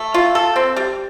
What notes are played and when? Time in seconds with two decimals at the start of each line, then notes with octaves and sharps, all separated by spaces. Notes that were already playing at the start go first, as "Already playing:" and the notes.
Already playing: A3
0.14 F4
0.35 A4
0.56 C4
0.76 G3